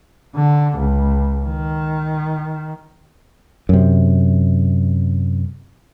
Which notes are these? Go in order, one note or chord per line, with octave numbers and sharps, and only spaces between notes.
D3
C#2
D#3
F#2 C3